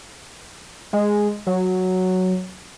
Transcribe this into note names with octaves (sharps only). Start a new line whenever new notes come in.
G#3
F#3